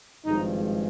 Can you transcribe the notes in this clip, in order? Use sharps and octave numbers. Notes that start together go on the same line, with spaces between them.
G#1 G2 F3 G#3 D#4